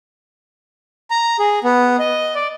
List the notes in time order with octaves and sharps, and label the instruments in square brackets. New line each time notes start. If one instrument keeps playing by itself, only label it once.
[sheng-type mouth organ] A#5
G#4
B3
D#5
D5